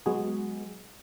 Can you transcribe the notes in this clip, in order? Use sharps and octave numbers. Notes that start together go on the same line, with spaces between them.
F#3 G#3 B3 F#4 G#4